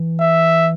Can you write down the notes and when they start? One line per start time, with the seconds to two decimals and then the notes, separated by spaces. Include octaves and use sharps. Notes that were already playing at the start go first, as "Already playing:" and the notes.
Already playing: E3
0.20 E5